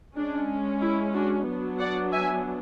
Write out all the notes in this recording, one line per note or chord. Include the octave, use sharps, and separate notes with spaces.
G#3 C#4 D4
E4
D4 F#4
F#3 B3 D4
D5 F#5
E5 G#5